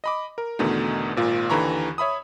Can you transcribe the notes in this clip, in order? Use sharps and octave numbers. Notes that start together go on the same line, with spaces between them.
D#5 B5 D6
A#4
E2 B2 D3 D#3 A3
G#1 A#2 F4
D#2 D3 E3 A#5 B5 C#6
C#5 E5 B5 D#6